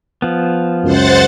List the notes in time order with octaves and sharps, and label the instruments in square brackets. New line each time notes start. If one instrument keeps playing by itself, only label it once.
[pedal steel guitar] F3 B3
[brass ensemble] C#2 F#2 [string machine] C5 F#5 A6